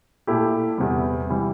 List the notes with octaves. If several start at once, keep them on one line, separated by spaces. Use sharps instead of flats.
A#2 A3 E4 G4
E2 C3 E3 G3
C3 E3 G3